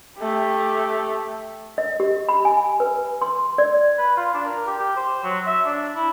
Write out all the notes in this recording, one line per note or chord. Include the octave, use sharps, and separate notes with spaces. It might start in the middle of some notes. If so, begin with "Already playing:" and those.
A3 G4
D#5
G4
B5
G#5
B4
C6
D5
B4
F4
D4
A#4
G4
G4
C5
F#3
E5
D4
E4